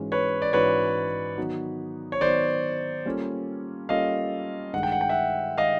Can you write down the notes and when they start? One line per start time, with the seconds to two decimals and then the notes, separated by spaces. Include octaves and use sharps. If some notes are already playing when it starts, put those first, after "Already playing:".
Already playing: G#2 E3 G#3 C#4 F#4
0.12 B4 C#5
0.42 D5
0.53 G#2 E3 G#3 C#4 F#4 B4 C#5
1.37 D#3 F#3 B3 D#4 F#4
2.12 C#5
2.21 D#3 F#3 B3 D#4 F#4 C5 D5
3.05 G3 A#3 C#4 F4 A4
3.89 G3 A#3 C#4 F4 A4 D#5 F5
4.73 G2 D#3 G#3 F#5
4.83 G5
4.92 F#5
5.01 G5
5.09 E5 F#5
5.58 D#3 G#3 D#5 F5